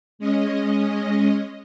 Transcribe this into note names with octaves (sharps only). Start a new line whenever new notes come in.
G#3 C#4 D#5